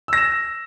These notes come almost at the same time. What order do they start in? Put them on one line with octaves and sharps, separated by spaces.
E6 A#6 E7